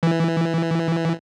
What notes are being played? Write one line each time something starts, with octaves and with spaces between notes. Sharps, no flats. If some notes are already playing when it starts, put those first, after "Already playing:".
E3